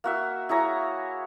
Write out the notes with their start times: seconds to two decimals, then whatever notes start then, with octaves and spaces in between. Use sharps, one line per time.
0.04 A#3 F#4 E5
0.49 E4 G#4 C#5 A#5